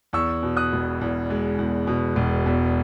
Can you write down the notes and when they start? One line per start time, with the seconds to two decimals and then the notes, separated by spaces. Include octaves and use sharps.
0.13 E2 C#6 E6
0.43 B2
0.57 D#6 F#6
0.72 E1
1.01 E2
1.30 G#3
1.59 E2
1.87 B2
2.16 E1
2.46 E2